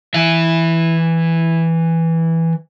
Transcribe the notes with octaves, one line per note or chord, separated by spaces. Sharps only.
E3 E5